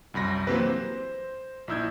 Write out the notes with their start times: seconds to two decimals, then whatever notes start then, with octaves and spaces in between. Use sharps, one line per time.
0.14 C2 F#2 B5 A#6
0.47 E3 F#3 A#3 C4 G4 B4
0.60 C5
1.68 A#1 D#4 E4 E6 G6 G#6